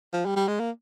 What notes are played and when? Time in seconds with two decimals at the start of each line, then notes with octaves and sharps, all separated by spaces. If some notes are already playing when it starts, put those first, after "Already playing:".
0.13 F3
0.26 G3
0.36 G3
0.48 G#3
0.60 A#3